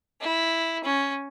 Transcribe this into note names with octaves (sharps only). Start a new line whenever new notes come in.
E4
C#4